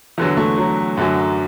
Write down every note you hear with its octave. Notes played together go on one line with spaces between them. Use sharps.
E2 D3 E3 F#3
A3
F#3
F#2 D3 F#3